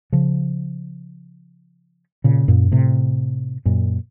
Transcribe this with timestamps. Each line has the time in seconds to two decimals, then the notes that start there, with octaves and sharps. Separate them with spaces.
0.12 C#3 F3
2.24 A#2 C#3
2.48 F#2 A#2
2.72 A2 C3
3.65 F#2 A#2